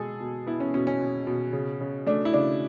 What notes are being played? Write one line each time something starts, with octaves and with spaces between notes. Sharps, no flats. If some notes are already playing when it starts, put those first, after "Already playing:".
Already playing: B2 G#3 G#4 A4
B2
B3 E4
C#4
B2 C#4
C#4
B2
B2
C#3
C#3
A3 D4
E4
C#3 D4